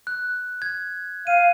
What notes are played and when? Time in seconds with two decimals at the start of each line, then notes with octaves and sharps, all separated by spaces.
0.07 F#6
0.62 G#6
1.27 F5 D#7